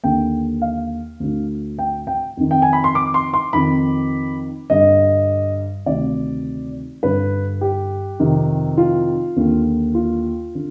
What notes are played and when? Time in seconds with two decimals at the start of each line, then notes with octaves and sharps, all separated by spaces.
0.03 D#2 D3 G5
0.62 F5
1.20 D2 D3
1.79 G5
2.07 G5
2.37 F2 D#3
2.51 G5
2.62 G#5
2.73 B5
2.84 C6
2.95 D6
3.14 C6
3.34 C6
3.53 F2 D#3 B5
4.70 G2 D3 D#5
5.86 D2 C3 D#3 D5
7.03 G2 D3 B4
7.61 G4
8.20 F2 C3 D#3
8.77 F4
9.36 D#2 D3
9.95 F4
10.55 D3